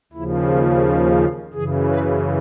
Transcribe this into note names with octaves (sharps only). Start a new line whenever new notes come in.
D#2 C#3 F3 E4
F4
F4
F4
F#2 C#3 E3 G#4
B4